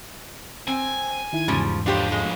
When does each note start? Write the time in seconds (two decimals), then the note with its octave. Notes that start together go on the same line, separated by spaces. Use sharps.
0.68 C4 G#5
1.33 D#3 E4
1.48 E2 G#2 C#3 F3 G3
1.86 A2 F3 D4 G4 C5
2.12 G#3